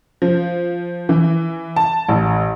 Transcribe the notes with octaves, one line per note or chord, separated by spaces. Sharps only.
F3
E3
A5
A1